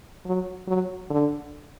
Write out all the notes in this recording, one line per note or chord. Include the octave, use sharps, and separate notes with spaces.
F#3
F#3
D3